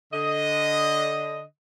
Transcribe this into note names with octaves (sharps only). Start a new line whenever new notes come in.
D3 D#5